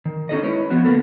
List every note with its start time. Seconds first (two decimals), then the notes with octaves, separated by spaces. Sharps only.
0.05 D#3
0.29 C#4 D#4 F#4 A4 D#5
0.43 G#3 E4 B4 C#5
0.70 F3 F#3 B3 F#4
0.85 D3 A#3 B3 A4